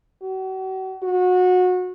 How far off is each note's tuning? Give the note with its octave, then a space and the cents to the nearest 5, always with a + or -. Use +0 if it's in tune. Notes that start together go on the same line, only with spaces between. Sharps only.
F#4 +40
F#4 -25